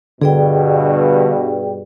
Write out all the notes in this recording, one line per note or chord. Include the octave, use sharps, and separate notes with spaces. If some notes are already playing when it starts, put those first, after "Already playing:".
G2 B2 D3 G#4 D5 G5